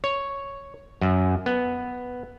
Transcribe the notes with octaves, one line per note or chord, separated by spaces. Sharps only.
C#5
F#2
B3